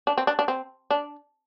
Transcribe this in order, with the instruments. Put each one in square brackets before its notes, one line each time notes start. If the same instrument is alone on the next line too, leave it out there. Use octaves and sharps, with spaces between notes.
[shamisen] D4
C4
D4
D4
C4
D4